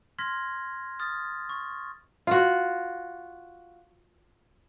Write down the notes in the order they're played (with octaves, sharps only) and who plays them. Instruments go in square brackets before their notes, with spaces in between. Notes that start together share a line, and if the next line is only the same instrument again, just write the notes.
[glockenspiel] C6 F6 G#6 A#6 B6
D#6 F6 A6
C#6
[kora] F4 F#4